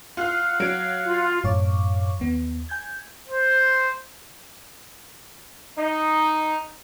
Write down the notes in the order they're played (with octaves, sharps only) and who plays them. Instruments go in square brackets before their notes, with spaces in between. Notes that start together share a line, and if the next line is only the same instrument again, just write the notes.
[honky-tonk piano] F4 F6 [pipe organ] F5 F#5
[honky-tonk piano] F#3 D7
[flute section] F4
[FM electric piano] F#2 A2 C#5 F5 C#6 D6
D#2 B3
G#5 G6 G#6
[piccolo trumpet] C5
[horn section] D#4